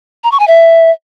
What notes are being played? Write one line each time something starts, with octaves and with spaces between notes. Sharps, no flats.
A#5
C#6
G#5
E5